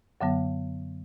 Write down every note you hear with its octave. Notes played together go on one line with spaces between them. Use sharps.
F#2 D3 F#3 B3